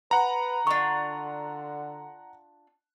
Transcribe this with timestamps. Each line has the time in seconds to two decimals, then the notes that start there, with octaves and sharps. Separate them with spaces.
0.11 B4 F#5 A#5
0.67 D3 D4 F4 C#6